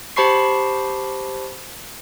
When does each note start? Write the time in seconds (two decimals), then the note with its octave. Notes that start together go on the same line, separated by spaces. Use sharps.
0.16 G4 C5 A5 B5 C#6 C7